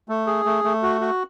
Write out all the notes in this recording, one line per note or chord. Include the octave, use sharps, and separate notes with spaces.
A3
G#4
A3
A3
F#4
F#4